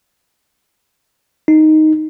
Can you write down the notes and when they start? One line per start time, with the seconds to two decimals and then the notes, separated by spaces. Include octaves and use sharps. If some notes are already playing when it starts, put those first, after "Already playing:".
1.48 D#4